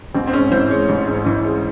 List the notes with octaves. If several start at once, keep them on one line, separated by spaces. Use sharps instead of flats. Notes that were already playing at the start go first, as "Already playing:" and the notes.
A1 C4
C4
G#2 C#4
E3 C5
G#3 C#5
A1
G#2
E3
G#3